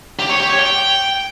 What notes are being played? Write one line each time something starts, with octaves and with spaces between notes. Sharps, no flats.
G4
C#5
G4
C#5
G5